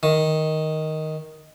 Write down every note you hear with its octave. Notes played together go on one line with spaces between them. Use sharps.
D#3